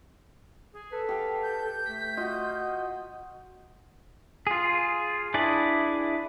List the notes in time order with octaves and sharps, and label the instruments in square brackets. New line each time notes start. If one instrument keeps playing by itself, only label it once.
[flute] G#4
[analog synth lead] A4 [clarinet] B4
[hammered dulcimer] G4 G5 [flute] F5
[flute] G6
[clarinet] A3 [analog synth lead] B6
[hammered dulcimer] F4 F#4 [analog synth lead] D#5
[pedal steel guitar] F4 G#4
D4 E4 G#4 B4 D5